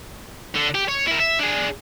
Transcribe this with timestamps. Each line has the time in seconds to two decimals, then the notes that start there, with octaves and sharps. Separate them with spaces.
0.56 D3
0.75 G4
0.88 C#5
1.07 E4 A#4
1.20 E5
1.39 D4 G#4